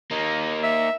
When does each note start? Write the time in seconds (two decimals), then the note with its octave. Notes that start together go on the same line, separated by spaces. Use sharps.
0.11 A#3 D#4
0.63 E5